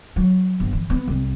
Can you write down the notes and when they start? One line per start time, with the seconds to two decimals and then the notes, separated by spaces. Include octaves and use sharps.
0.16 F#3
0.60 G1
0.73 E3
0.90 B3
1.08 C2